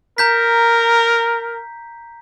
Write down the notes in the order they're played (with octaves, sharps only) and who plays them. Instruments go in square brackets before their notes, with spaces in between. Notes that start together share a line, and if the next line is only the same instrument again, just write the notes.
[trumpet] A#4 [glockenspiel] A#5 G6 B6